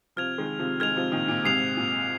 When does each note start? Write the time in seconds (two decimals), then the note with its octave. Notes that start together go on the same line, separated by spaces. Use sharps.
0.16 C3 F3 F6 G#6 F7
0.38 D#3 G#3
0.59 C3 F3
0.80 D#3 G#3 F6 G#6 F7
0.96 C3 F3
1.12 A#2 D#3
1.28 A#2
1.44 G#2 C3 D#6 C7 F7
1.77 A#2